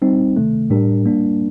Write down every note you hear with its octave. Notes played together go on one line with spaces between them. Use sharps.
G3 C4 D#4
C3 D#3 A3
A2 G3 D4 G4 A#4
G3 A#3 D4